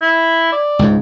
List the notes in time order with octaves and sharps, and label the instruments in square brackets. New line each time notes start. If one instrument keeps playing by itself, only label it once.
[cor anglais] E4
D5
[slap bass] C#2 G#2